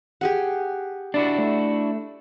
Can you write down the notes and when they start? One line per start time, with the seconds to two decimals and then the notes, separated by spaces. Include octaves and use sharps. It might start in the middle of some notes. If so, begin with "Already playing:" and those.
0.21 G4 G#4 F#5
1.14 D4 E4 F#4 D5
1.39 A3